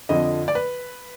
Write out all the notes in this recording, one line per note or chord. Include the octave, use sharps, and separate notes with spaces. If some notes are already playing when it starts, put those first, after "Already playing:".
F2 D3 F3 D#5
D5
B4